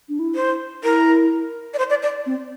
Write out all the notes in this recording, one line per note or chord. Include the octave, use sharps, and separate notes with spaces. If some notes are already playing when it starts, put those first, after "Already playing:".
D4
E4
C5
E4 A#4
D5
C5
D5
D5
C4